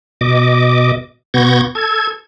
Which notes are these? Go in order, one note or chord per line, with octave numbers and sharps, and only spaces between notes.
B2 D#5 D6
B2 B3 C#6 G6 G#6 A#6
A4 G#6